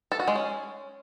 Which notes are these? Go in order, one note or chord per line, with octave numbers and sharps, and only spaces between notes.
A4
F#4
G#3
C#4